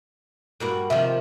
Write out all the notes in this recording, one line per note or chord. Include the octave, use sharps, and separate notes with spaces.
G2 A#3 F#4
C3 D#3 F3 E5